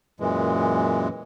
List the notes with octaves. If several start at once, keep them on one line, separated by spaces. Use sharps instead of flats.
F#2 A#2 E3 G#3